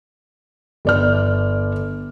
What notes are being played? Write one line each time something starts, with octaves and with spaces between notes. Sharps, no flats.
G1 D5 F6